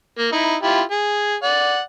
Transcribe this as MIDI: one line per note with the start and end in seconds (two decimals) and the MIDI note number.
0.18 0.28 58
0.33 0.55 63
0.33 0.55 64
0.63 0.82 64
0.63 0.82 65
0.63 0.82 67
0.91 1.35 68
1.43 1.81 74
1.43 1.81 78